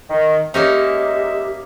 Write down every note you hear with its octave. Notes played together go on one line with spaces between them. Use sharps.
D#3
G#3 A#3 C#4 D#4 G4 E5